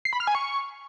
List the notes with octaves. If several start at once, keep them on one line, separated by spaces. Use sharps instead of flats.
C7
B5
F6
G#5
C#6